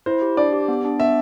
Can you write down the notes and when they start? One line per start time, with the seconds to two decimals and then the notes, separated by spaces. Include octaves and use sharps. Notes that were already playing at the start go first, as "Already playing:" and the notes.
0.06 E4 C5
0.22 G4
0.37 D4 D5
0.53 G4
0.68 B3
0.85 D4
1.00 B3 E5